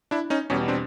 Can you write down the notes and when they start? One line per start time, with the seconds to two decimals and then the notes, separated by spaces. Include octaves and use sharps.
0.11 D4 E4
0.30 C#4 D#4
0.50 E2 B2 G3 C#4
0.68 C4 D4